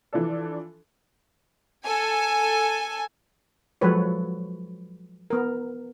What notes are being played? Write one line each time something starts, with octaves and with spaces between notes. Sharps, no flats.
E3 F3 D4 A4
A4 G#5
F3 F#3 G#3 A4 B4 C#5
B3 A#4